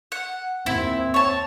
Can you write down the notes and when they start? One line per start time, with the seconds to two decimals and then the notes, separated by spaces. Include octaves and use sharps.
0.12 F#5
0.66 D#2 C4 E4
1.14 C#5 A5